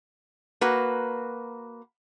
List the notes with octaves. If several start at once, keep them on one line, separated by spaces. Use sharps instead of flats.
A#3 F#4 B4